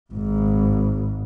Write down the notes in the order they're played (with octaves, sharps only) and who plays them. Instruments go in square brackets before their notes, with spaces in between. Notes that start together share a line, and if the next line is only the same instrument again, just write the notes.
[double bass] G#1 G#2